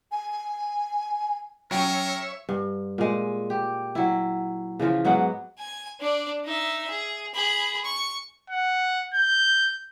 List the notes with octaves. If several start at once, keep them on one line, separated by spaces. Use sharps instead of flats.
G#5
F#3 C#4 A#4 C#5 E5 G5 G#5
G2
A#2 G#3
G4
F#3 E4
C#3 E3 F3 F4
G#2 F#3 B3 F#5
G#5
D4 D5
D#4 E5
G#4
G#4 B5
C#6
F#5
G6